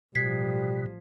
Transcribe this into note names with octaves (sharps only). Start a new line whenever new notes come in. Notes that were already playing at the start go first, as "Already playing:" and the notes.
A1 B2 F3 G3 G#6 B6 C7